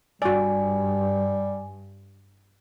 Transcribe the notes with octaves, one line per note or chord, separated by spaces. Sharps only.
G2 G3 F#4 D5 G#5